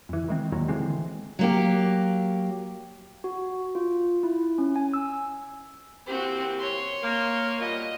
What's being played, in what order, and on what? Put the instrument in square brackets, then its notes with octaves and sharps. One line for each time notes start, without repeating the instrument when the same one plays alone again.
[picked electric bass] F2 E3
D#3 G#3 C4
D#2 A#2 D#3 F#3
D3 E3 G#3 C4
[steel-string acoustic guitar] F#3 A#3 G4
[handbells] F#4
F4
E4
C#4
G#5
E6
[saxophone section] E3 A#3 G4 [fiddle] C4 F#4
[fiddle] C#5 C6
[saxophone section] A#3
[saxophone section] B2 G3 F4 [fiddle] D#5